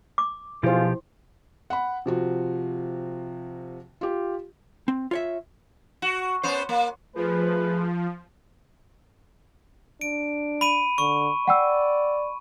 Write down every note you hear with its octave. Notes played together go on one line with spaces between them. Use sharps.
D6
B1 B2 F3 E4 F4 G4 G#4 C5
F#5 B5
C3 F3 F#4
F4 G4
C4
F4 C#5 E5
F#4
B3 C#4 C5
A#3
F3 A3 G#4 B4
D4 D7
B5 D#7
D3 C#6
D5 F#5 G5 E6